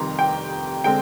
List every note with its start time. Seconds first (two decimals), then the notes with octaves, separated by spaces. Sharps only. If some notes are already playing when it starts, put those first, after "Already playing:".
Already playing: F1 F2 C3 D#3 G3 A#5 C6
0.19 G5
0.84 D3 G#3 C4 G5